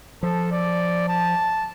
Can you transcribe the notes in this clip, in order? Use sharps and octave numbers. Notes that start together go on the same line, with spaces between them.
F3 A4
D5
A5